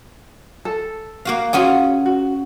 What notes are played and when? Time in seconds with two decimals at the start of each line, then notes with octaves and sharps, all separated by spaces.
0.65 A4
1.25 A#3 F#4 F5
1.53 C#4 F4 F#4 G#4 F#5
2.06 F#4